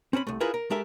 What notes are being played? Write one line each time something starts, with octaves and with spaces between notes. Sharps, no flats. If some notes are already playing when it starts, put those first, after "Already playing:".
C4 C#4 C5 B5
C2 A3
E4 F4 G#4 A#4 B4
A#4
G#3 G4 A4 A#4 E5